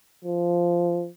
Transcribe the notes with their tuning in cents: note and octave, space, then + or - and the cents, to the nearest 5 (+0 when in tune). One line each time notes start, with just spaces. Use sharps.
F3 -10